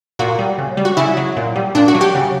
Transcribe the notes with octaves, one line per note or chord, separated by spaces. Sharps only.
A#2 F#4
G3
C#3
G3
F#4
C#3 E4
F#3
A#2
G3
A#2 D4
F#4
F#3
G4
C#3